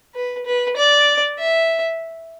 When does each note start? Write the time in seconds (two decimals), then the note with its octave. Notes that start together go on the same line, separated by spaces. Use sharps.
0.15 B4
0.46 B4
0.76 D5
1.38 E5